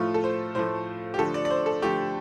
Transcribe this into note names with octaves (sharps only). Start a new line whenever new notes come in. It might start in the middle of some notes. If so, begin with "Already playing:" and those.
Already playing: A2 F3 A3 F4
A4
C5
A2 F3 A3 C5
G4
D3 F3 A3 A4
D5
D5
C5
A4
D3 F3 A3 G4